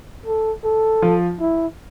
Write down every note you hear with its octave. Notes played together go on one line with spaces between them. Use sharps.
A4
A4
F3 F4
E4